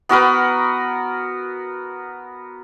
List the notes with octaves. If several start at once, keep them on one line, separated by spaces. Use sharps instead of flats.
B3 F#4 A#4 B4